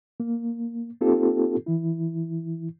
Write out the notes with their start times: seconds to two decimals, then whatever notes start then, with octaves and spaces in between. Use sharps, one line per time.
0.20 A#3
1.01 A#3 C4 D#4 F4 G4 A4
1.66 E3 E4